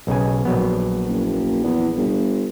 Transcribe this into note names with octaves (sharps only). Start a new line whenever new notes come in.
B1 C#3 G#5
A#1 F#3 B3
F#1
E2
G1